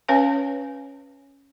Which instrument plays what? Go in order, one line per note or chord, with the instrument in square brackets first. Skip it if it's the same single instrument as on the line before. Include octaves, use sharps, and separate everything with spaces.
[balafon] C#4 B4 C#5 F5 G#5